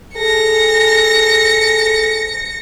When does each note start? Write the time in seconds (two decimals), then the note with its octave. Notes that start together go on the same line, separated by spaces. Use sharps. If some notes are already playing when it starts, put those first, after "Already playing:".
0.17 G#4 A4 A#6 C#7